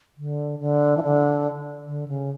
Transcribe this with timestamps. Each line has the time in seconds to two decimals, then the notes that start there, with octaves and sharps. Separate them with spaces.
0.18 D3
0.60 D3
0.97 E3
1.03 D3
1.87 D3
2.08 C#3